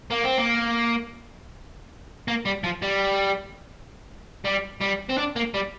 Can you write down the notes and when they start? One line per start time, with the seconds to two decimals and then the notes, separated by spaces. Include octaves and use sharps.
0.10 A#3
0.24 C4
0.38 A#3
2.28 A#3
2.45 G3
2.64 F3
2.82 G3
4.45 G3
4.81 G3
5.10 C4
5.18 D4
5.36 A#3
5.54 G3